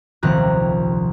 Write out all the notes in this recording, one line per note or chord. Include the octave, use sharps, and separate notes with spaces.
D#1 C2 F3 C4 A#5 F#6